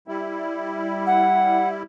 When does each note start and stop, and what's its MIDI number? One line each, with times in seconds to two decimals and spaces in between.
0.08 1.83 55
0.08 1.83 64
1.07 1.68 78